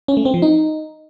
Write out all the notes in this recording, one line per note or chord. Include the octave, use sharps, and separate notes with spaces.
C#4
A3
C4
F3
D#4